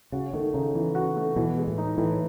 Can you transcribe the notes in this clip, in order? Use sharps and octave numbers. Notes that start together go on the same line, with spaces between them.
C#3 F#4
D#3 A3
C#3 D#4
E3
F#4
A3
B2 E3
G#3
A2
D#4
A2 E3